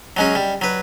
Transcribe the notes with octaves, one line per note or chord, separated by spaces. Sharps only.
F#3 G#3 C#4
G3
F#3 B4